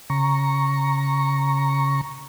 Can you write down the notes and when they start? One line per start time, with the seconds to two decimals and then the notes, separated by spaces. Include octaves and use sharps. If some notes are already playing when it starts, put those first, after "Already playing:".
0.10 C#3 A#5 C#6